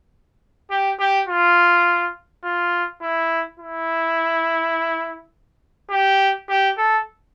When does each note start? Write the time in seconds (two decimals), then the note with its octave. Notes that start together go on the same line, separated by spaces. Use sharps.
0.71 G4
1.00 G4
1.28 F4
2.44 F4
3.02 E4
3.60 E4
5.91 G4
6.49 G4
6.78 A4